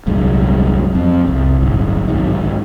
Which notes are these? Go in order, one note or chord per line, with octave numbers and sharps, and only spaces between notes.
D#1 C2 F#2 G#3
F2 C4
C2
D1 G1
B1 G#2 D#3